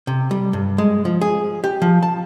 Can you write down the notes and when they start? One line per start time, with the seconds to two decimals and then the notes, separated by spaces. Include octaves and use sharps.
0.07 C3
0.31 G3
0.53 G2
0.78 G#3
1.05 F3
1.21 G#4
1.64 G4
1.82 F3
2.03 A5